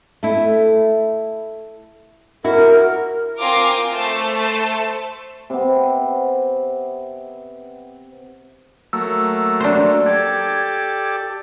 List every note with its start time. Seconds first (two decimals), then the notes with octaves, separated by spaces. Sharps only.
0.23 A3 E4
2.44 E4 F#4 A#4
3.39 C4 F4 A#4 G#5 D6 A#6
3.92 A3 C5 A5
5.50 C3 B3
8.93 F#3 A3 A#3 E6
9.60 D4 C5
10.06 G4 A4 D5 G#6